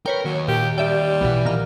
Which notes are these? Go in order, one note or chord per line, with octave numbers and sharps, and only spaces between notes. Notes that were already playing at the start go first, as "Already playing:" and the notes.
A#4 B4 C#5 G5
D#2 F#3
A#2 G4
G3 G4 E5 G5
B1 B2 E3
A#2 D#3 F6